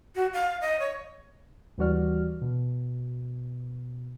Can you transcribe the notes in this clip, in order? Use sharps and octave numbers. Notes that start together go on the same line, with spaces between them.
F#4
F5
D#5
C#5
D#2 E3 G3 F#4 D5 F6
B2